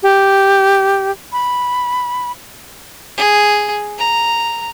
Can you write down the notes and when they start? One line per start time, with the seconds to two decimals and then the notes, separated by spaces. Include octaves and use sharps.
0.03 G4
1.32 B5
3.17 G#4
3.98 A#5